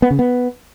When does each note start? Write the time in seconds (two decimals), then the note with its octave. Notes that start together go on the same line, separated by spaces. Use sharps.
0.02 B3
0.11 C#3
0.19 B3